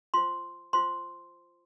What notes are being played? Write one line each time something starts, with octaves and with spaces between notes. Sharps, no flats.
F4 C5 C6
F4 C5 C6